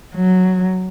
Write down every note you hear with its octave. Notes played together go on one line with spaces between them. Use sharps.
F#3